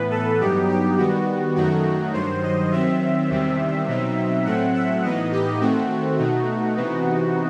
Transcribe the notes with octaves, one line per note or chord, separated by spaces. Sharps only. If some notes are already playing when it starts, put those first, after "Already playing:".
Already playing: A2 E3 B3 B4
A4
G2 F#3 B3 D#4 G4
G4
D#3 G3 B3 F#4
F#2 D#3 F#3 A3 D#4 F#4
G2 D#3 F#3 C5
D#5
D#3 F#3 C4 E5
E2 C3 D#3 G3 C4
B2 F#3 C4 D#4
A2 F#3 A3 C4 F#5
E5
A2 E3 B3 D#4 D#5
G4
D#3 A3 C4 F#4
B2 A3 D#4
C3 E3 B3 D#4